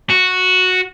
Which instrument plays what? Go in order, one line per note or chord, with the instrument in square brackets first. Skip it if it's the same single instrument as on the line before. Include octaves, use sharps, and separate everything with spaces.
[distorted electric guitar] F#4